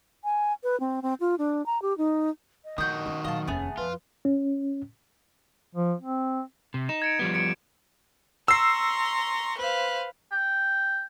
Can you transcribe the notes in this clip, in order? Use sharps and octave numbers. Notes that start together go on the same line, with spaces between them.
G#5
B4
C4
C4
F4
D4
A#5
G4
D#4
D#5
D#3 D4 F#4 D#6 G6
C#4
A#2 F#3 D#5 F5 A5
F1 D#2 A3 B3 C#4 G#4
F2 F4 B4
C#4
F3
C4
C3
D#4 E7
G#6 C#7 D7
F3 G3 B3
G#6 C#7 D7
A#5 C6 C#6 E6 C7
B4 C5 F5
G5